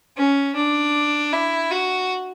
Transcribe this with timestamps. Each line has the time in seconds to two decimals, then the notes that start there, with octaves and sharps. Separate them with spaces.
0.17 C#4
0.55 D4
1.32 E4
1.71 F#4